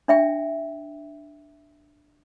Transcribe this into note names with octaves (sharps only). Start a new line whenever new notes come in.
D4 E5 G5